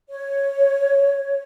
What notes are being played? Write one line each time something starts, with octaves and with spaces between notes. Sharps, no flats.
C#5